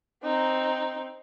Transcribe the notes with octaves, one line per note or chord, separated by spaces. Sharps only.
C4 D#4